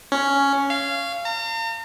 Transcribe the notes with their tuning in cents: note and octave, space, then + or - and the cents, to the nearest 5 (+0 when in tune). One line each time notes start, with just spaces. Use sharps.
C#4 +5
F5 -20
A#5 -45